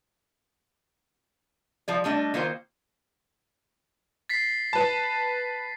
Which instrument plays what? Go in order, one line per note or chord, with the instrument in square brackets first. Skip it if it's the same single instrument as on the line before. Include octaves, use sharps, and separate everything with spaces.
[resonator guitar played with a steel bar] F3 G#3 D5
G3 A3 D4 D#5
D#3 A#3 F4 C5
[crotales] A6 B6 C7
[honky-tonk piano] B4 A5